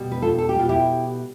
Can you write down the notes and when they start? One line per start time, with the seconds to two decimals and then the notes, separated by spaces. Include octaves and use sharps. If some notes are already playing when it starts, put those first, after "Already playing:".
Already playing: B2 G3
0.12 B4
0.22 F4 A4
0.38 A4
0.49 G4
0.55 B2 G3 F4
0.69 E4 G4